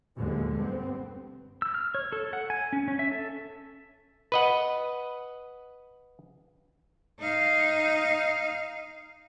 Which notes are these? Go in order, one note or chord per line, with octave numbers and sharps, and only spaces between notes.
D#2 B2 D3 F#3 G#3
G2 B3 C4
E6
F6
C#5
A4
F#5
G#5
C#4
C#4
E5
A4
B4 D#5 F#5
D#4 F5